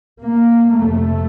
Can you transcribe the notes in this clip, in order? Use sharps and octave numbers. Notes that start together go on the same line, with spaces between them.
A#3
F2 C3 A3